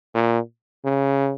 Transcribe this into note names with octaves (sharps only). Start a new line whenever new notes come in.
A#2
C#3